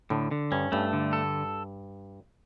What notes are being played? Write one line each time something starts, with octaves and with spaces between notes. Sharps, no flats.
A2 D3
D3
G2 C#4
G2 A3
D3
A4